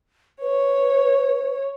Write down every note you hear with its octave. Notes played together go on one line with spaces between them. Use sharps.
B4 C#5